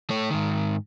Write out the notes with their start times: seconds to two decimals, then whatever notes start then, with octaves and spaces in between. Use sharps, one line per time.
0.10 A3 C#5
0.31 G#2 D#3